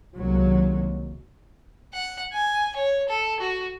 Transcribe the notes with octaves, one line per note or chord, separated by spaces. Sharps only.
C2 D#3 F#3 G#3 A#3
F#5
G#5
C#5
A4
F#4